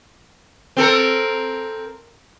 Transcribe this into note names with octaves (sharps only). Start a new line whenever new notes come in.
C4 A4 A#4